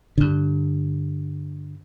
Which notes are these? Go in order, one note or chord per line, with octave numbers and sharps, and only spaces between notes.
G2 D3